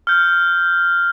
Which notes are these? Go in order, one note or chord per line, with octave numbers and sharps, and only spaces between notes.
F6 G6